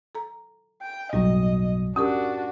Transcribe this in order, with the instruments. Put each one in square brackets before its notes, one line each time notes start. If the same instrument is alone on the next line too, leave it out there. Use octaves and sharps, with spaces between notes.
[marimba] A4 A#5
[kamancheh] G5
[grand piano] B1 [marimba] F#2 A2 G3 [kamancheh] D#5
[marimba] C#4 G4 A#4 [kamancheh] D4 F#4 [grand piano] D#6